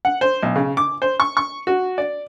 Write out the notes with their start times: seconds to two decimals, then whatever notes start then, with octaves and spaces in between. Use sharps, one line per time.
0.05 F#5
0.21 C5
0.43 B1
0.56 C#3
0.77 D6
1.02 C5
1.20 C#6
1.37 C#6
1.67 F#4
1.98 D5